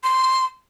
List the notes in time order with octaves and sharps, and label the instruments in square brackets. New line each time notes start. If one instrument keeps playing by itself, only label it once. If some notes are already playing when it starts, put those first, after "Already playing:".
[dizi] C6